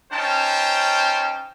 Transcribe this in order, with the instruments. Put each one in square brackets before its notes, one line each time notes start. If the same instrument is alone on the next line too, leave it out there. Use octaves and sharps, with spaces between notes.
[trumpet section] C#4 D#4 C5 G5 A5